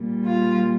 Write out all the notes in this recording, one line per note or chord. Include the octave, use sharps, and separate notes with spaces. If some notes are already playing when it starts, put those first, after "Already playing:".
Already playing: A#2 G3
F4